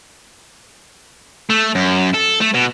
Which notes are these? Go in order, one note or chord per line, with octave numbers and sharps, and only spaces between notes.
A3
F#2
A4
A3
B2